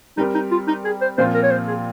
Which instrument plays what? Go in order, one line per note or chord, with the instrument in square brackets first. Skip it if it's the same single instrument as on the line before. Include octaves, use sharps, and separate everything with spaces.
[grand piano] G3 C4 G4 A#4 [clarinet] D#4
[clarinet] D#4
F4
D#4
G#4
C5
[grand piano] A#2 F3 C4 F4 [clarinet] C5
[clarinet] A#4
C#5
C5
G#4